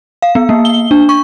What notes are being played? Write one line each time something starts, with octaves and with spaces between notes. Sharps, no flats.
F5
B3
A#3
G7
D4
C#6